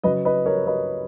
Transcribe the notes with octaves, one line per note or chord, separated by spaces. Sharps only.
C#3 F#3 B4 D#5
B4 D#5
A#4 C#5
B4 D#5